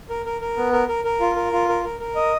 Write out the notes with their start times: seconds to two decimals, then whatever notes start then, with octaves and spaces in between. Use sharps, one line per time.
0.10 A#4
0.26 A#4
0.41 A#4
0.57 B3
0.73 A#4
0.88 A#4
1.04 A#4
1.21 F4
1.36 A#4
1.52 F4
1.69 A#4
1.84 A#4
2.00 A#4
2.16 D#5